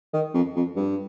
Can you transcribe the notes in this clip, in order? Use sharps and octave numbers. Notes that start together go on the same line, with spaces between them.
D#3
F2
F2
G2